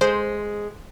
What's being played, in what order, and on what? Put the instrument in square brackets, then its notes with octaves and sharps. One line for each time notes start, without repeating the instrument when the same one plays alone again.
[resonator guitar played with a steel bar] G#3 [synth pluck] C5